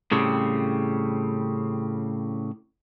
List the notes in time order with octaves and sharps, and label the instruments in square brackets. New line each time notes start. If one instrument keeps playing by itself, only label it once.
[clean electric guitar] A2 C#3 G3 C4